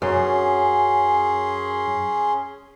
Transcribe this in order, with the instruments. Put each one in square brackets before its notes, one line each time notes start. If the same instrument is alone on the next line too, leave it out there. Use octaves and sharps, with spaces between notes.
[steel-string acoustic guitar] F#2 [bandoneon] C#4 G#4 C6